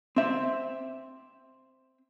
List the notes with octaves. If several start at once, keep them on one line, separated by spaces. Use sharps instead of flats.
C4 E5